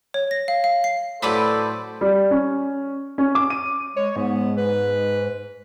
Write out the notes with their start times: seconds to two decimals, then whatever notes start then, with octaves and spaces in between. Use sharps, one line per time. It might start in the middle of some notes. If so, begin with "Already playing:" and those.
0.14 C#5
0.31 A#6
0.48 F5
0.64 F5
0.84 C7
1.23 A2 F#3 A4 B4 C5 D5 B5
2.01 G3
2.31 C#4
3.18 C#4
3.35 D6
3.50 D#7
3.96 G#3 C#5
4.16 G#2 B3
4.57 B4